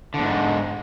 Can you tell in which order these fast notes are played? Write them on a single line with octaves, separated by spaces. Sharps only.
D3 E2 G#2